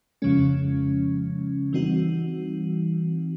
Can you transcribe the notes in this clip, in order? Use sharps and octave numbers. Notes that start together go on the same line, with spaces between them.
F2 C#3 F3 G#3 C#4
E3 G3 C4 D#4 F#4